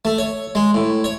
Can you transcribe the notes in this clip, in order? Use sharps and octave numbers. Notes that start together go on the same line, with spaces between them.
A3
C#5
G#3
A2
C#5